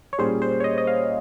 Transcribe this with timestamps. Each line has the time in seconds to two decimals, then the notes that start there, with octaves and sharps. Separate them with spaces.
0.13 C#5
0.18 A#2 G3 C#4 G#4 C5
0.42 C5
0.60 C#5
0.64 D#5
0.78 D#5
0.87 F5